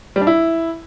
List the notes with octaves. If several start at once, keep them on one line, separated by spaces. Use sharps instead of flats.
G3
D4
E4